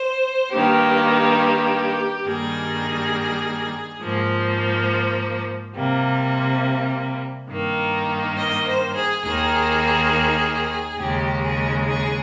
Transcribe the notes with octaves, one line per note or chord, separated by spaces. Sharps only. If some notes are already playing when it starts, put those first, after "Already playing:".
Already playing: C5
G2 D#3 A#3 G4
G2 D#3 G3 A#3 G#4
G#2 F3 A#3
C3 G3 A#3
G2 D#3 A#3
D#5
C5
G#4
D#2 D#3 A#3 G#4
D#2 C#3 G#3 G4
G#4
G#4